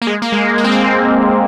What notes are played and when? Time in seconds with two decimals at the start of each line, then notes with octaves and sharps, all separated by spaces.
0.02 A#3
0.07 G#3
0.22 A#3
0.32 G#3
0.58 A#3
0.64 C4
0.71 A#3